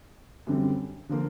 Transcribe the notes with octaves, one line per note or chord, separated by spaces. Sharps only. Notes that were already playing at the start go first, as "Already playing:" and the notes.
F#2 D3 G3 C4
D3 F3 A#3